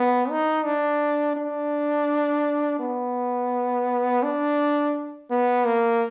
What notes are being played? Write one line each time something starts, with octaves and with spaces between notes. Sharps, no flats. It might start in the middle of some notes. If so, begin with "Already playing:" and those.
Already playing: B3
D#4
D4
D4
B3
D4
B3
A#3